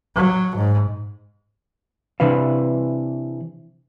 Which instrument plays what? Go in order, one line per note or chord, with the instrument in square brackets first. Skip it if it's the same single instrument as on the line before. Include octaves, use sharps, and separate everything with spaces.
[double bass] F#3
G#2
[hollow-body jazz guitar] C3 E3 D4 B4 F5